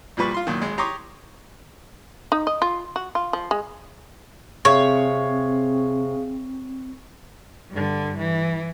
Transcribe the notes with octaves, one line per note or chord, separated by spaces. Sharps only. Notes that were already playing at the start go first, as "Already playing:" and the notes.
A#1 A#2 F3 G3 B4 C#6
F4 C6
F#2 A#2 D#3
G#1 G#3
G4 C#5 A#5 C6 D6 D#6
D#4
D#5
F4
F#4
F4
F3
G#3
C3 C4 G#4 C#5 F5 C#6
G2 D3
E3